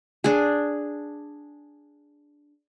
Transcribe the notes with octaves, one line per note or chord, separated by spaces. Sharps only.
D4 G#4